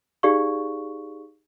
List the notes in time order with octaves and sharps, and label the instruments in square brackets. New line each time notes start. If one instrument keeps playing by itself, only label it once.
[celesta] D#4 G4 G#4 D5 F5 C#6